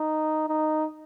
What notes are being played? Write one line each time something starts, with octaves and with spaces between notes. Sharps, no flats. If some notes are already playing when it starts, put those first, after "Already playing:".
Already playing: D#4
D#4